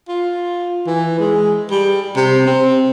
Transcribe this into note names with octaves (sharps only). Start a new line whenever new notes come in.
F4
E3
G#3
G3
C3
C4